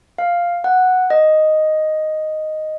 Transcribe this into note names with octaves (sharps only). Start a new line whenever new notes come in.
F5
F#5
D#5